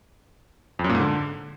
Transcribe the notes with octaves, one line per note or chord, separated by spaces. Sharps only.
F2
F#2
A#2
G#2
D3